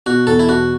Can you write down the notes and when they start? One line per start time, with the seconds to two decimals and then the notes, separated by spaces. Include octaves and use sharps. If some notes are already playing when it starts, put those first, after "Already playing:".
0.06 B2 F#4
0.27 E2 A4
0.39 E4
0.49 B2 F#4